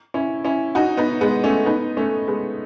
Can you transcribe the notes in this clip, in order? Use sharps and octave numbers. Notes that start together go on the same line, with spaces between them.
C#4 E4
C#4 E4
D#4 F#4
B3 D#4
G#3 B3
A3 C#4
B3 D#4
A3 C#4
G#3 B3